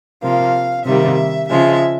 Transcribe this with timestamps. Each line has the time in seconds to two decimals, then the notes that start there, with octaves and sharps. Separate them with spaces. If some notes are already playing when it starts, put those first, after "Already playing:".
0.22 C3 F3 A#3 F5
0.85 C3 D#3 G3 A#3 E5
1.48 C#3 F3 G#3 E5